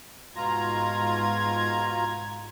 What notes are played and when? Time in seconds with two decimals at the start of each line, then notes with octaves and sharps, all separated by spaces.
0.36 G#2 B2 F4 A#5 G#6